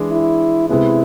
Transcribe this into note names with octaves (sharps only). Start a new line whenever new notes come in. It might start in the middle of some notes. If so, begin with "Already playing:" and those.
Already playing: E3 G#3 D4
E4
C3 G#3 B3 E4